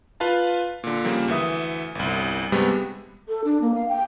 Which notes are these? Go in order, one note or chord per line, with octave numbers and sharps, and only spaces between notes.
F4 B4 F5 A5
A#2 D3
C#3 F3 G3 A#3
D2 E3 E5 D#6
G1 C2
G2 C3 G3 G#3 B3
A4
D4
A#3
F5
G5